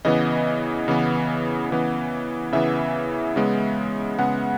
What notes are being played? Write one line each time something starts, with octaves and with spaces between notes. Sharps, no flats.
C#3 E3 B3 D#5
C#3 E3 B3
C#3 E3 B3
C#3 E3 B3 E5
C#3 G#3 B3
C#3 G#3 B3 F#5